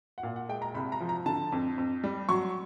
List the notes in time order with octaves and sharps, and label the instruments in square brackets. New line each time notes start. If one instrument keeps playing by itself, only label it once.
[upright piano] F#5
A#2 F5
F#5
G#3 G5
A#5
C2 B5
A#5
F3
A#5
D3 A5
F2
F2
G3
F#3 C#6